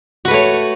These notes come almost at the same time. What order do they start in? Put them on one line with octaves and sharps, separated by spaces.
F#4 B4 A3 C#5